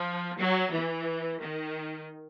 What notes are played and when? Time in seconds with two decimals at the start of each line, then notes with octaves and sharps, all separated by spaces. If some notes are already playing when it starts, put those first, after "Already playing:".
Already playing: F3
0.39 F#3
0.73 E3
1.42 D#3